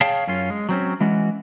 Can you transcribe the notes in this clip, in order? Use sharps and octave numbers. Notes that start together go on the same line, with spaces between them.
G#4 C#5 F5 G5 A5
F#2 C#4 F4
G#3
F#3 C4 C#4
E3 G#3 C#4 F#4